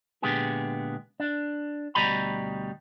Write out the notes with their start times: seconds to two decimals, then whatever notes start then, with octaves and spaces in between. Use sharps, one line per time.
0.22 A#2 D3 G#3 B3 G4 G#4
1.20 D4
1.95 D2 B2 G3 D#5 A#5 B5